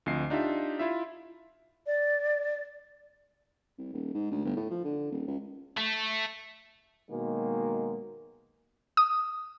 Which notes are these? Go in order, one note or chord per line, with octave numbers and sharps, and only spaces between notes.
D2 F3 C4 D#5 C7
D4 D#4 F4 G4 E5
E4 F4 E5
D5
C2
D#1
G#2
D2
G1
A2
F3
D3
D#1
C#2
A3
B2 D#3 F#3 G#3 A#3
D#6